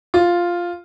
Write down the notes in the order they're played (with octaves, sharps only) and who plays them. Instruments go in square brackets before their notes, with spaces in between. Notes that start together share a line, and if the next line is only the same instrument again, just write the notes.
[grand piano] F4